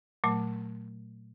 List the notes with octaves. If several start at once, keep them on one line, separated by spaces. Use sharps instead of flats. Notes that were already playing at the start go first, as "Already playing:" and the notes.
A#2 F#3 A3